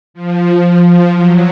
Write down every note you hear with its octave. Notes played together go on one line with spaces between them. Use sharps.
F3
F#3